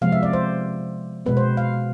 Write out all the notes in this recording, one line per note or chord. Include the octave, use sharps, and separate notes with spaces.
C3 F3 G#3 B3 F5
E5
D5
C5
B2 G#3 B3 B4
C5
F5